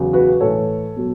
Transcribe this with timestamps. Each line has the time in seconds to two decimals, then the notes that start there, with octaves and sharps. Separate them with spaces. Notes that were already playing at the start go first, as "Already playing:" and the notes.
Already playing: E2 C#3 F#3
0.13 F#4 B4
0.40 A2 E3 A4 C#5
0.97 B2 F#3